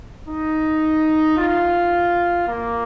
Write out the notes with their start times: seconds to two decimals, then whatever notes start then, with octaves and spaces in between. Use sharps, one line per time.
0.28 D#4
1.38 F4
2.47 A#3